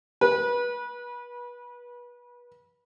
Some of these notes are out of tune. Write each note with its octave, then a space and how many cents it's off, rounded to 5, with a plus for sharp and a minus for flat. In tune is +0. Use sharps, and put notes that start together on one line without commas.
B4 -25